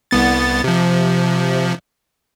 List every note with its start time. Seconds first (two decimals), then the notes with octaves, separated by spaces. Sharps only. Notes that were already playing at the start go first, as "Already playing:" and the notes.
0.11 C2 B3 A6
0.64 C3 F3